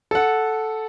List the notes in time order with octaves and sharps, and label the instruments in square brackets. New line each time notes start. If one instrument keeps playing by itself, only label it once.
[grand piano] A4 F#5